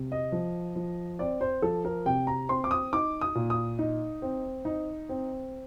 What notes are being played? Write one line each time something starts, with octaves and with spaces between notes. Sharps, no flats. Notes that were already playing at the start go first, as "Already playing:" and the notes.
Already playing: C3
D#5
F3
F3
C4 D5
C5
F3 A4
A#4
C3 G5
A#5
C4 C6
D6
D#6
D#4 D6
D#6
A#2
D#6
D#4
C4
D#4
C4